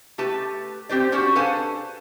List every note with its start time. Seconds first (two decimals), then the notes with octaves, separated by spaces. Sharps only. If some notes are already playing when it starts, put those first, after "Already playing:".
0.18 A3 G4 B4 A5
0.89 C4 G4 C5 D5
1.12 C#4 D4 F#4 G4 C5
1.35 A4 B4 C5 F5 G#5 A5